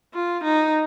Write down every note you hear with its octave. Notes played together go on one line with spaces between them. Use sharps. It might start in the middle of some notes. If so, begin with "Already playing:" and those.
F4
D#4